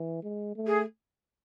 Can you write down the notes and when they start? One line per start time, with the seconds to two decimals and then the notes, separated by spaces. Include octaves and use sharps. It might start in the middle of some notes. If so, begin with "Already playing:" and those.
Already playing: E3
0.23 G#3
0.56 A3
0.66 G#4